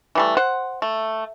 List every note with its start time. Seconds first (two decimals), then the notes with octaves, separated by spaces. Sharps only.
0.15 E3 G3 A3
0.37 C5 F#5
0.82 A3